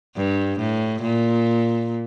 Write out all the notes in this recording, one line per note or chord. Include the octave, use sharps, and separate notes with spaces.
G2
A2
A#2